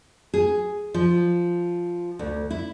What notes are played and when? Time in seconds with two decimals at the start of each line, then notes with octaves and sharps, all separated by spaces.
0.34 G#4
0.94 F3
2.19 D2
2.50 E4